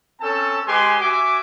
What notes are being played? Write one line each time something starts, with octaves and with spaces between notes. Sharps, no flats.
C4 C#4 A4 G#5 A5
G#3 G4 B4 G#5 C6
F#4 E5 G#5 D6